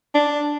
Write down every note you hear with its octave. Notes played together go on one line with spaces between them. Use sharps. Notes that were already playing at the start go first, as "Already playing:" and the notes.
D4